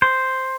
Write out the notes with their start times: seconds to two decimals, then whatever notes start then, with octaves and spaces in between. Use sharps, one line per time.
0.02 C5